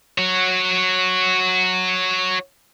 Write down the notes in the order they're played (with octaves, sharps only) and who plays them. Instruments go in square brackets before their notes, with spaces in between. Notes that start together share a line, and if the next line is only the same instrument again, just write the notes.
[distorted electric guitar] F#4 C#5